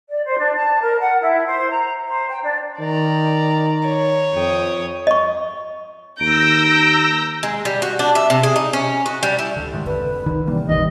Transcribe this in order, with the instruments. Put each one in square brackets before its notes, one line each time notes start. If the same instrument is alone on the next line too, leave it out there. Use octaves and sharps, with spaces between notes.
[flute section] D5
C5
D4
A5
A#4
F#5
E4
C5
A#5
C5
G5
D4
[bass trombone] D#3 [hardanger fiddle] D5 A#5
[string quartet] C#5
[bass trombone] F2 [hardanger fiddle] G5 D#6
[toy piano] D#5 C#6
[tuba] D#2 [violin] A#5 G6 [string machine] E6 A#6 [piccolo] D7
[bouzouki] G#3
G3
F#4
D4
E5
C3
G#4
D#4
C#4
F#4
G3
E4
[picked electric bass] D2 D3
G#2 D#3
[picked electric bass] F1 C2 D3 [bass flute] B4
[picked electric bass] D3 [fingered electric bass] D#3
[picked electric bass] C3 E3 A#3 [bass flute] G3
[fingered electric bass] A1 E2 D#3 [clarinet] D#5